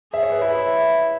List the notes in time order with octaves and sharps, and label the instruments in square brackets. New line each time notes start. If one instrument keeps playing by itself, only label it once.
[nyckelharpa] G#4 [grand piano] E5
[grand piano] C#5
B4
[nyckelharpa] E4 [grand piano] E5